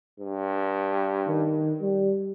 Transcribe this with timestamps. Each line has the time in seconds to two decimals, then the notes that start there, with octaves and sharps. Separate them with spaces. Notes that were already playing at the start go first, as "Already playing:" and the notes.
0.20 G2
1.27 D#3
1.81 G3